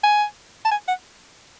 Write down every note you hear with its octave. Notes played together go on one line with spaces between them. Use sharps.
G#5
A5
G#5
F#5